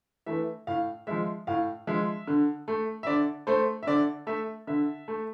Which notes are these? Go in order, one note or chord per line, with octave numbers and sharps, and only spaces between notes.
E3 A3 E5
A2 F5
F3 G#3 E5
A2 F5
F3 G#3 E5
D3
A3
E5
D3 D5
A3 C5
E5
D3 D5
A3 E5
D3 E5
A3